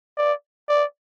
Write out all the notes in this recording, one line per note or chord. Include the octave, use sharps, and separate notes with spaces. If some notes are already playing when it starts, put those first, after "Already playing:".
D5
D5